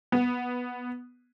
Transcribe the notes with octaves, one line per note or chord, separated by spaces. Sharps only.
B3